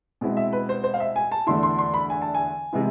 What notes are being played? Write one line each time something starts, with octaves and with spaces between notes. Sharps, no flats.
B2 G#3 C4 E4
E5
B4
C5
C5
F5
E5
G#5
A5
E2 D3 A3 E4 C6
C6
C6
B5
G#5
A5
G#5
C3 E3 G#3 B3 E4